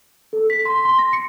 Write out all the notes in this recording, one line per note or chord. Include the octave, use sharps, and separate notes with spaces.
A4
B6
C6
C6
A#6
C#7